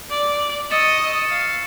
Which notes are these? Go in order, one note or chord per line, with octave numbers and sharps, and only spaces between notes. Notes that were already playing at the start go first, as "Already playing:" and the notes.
D5
D#5 C#6 E6 A6 C#7 E7
F5